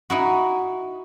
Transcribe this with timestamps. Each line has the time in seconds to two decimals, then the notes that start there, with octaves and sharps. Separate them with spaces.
0.10 D#4 E4 F#4